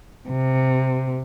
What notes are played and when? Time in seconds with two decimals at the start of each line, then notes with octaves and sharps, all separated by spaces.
0.29 C3